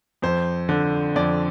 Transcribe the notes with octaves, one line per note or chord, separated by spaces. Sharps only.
F2 C5
D3
F2 D5